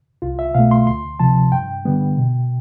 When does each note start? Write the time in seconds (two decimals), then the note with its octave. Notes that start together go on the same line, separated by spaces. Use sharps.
0.22 C2 F4
0.39 E5
0.54 B2 A3 F5
0.71 C6
0.87 D2 C6
1.19 C3 F3 A5
1.52 G2 G5
1.85 D3 G3 B3
2.17 B2